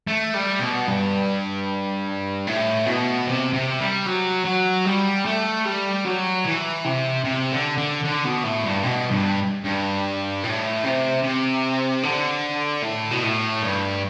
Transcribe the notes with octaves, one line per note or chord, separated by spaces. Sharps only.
A3
G3
B2
G2
A2
B2
C3
C3
G3
F#3
F#3
G3
A3
G3
F#3
E3
C3
C3
D3
D3
D3
B2
A2
G2
B2
G2
G2
A2
C3
C3
D3
A2
B2
A2
G2